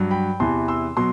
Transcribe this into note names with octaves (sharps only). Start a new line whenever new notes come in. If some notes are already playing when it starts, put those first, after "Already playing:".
Already playing: G2 F#3
G5 B5
E2 C3 E3 A5 C6
C6 E6
B2 F#3 C6